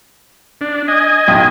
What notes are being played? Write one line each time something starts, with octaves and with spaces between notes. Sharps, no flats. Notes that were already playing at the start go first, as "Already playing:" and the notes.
D4
D#5 G#5
D1 B1 G5